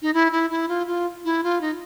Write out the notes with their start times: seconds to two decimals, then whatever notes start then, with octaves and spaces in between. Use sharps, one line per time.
0.02 D#4
0.14 E4
0.32 E4
0.50 E4
0.68 F4
0.87 F4
1.25 E4
1.44 F4
1.61 D#4